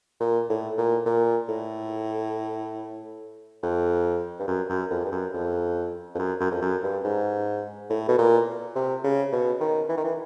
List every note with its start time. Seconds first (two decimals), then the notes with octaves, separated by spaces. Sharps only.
0.20 A#2
0.49 A2
0.78 A#2
1.06 A#2
1.49 A2
3.63 F2
4.39 G2
4.48 F#2
4.69 F#2
4.91 F2
5.05 G2
5.12 F#2
5.34 F2
6.15 F2
6.19 F#2
6.40 F#2
6.51 F2
6.61 F#2
6.83 G2
7.04 G#2
7.90 A2
8.08 B2
8.18 A#2
8.76 C3
9.04 C#3
9.32 B2
9.60 D#3
9.89 E3
9.97 D#3
10.04 E3